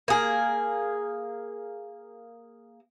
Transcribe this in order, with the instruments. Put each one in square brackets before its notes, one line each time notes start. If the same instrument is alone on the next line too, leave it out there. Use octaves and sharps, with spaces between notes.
[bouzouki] A#3 G#4